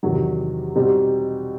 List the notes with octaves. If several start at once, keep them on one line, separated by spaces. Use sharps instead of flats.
E2 C3 D#3 F#3
B2 G3 C4 D#4 G4